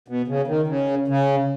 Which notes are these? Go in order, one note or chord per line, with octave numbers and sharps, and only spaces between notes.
B2
C#3
D#3
C#3
C#3